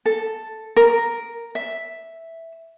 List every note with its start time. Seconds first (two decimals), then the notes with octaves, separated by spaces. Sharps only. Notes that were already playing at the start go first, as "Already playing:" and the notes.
0.06 A4
0.77 A#4
1.55 E5